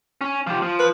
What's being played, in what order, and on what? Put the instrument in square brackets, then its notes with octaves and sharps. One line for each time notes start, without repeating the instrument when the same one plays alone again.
[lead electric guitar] C#4
F3 G4
F3
[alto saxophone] B4